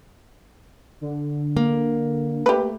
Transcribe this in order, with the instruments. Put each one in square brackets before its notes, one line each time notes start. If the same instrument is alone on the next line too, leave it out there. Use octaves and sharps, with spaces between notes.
[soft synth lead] D3
[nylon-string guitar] A#3
[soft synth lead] A3 [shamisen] G4 B4